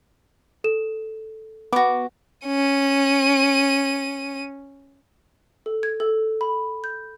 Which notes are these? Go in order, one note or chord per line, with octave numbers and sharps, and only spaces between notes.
A4 E7
B3 F#4 D6
C#4 D#7
A4
G#6
A4
B5
G6